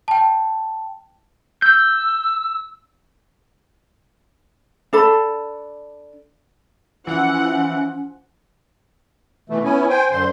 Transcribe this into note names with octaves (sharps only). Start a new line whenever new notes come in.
G5 A5
E6 G6
D4 A4 B5
E3 F3 C#4 F#5
B2 E3 A3
B3 C#4 E4 G#5
C5 G5 G#5
F#2 D3 C5 C6